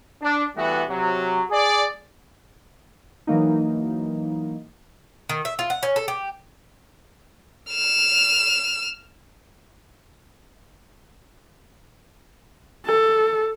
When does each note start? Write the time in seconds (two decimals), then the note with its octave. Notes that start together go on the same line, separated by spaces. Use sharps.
0.22 D4
0.56 E3 G3 A3 B3 F#4
0.88 C3 F#3
1.50 G#4 D5
3.27 E3 F#3 A#3 D#4
5.29 D#3
5.45 E5
5.59 F4
5.70 F#5
5.83 C#4
5.96 A4
6.08 G4
7.71 F6 E7
12.86 A4